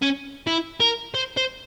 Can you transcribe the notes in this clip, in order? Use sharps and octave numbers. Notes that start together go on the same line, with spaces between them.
C#4
E4
A#4
C5
C5